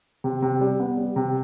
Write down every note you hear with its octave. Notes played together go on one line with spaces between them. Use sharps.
C3
C3
G3
B3
G3
C3